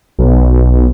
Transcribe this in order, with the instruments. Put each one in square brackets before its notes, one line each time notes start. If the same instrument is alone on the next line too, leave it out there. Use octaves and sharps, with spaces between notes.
[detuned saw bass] B1